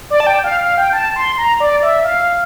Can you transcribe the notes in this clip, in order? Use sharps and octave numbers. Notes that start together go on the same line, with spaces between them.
D5
A5
G5
F5
F5
G5
A5
C6
A#5
D5
E5
F5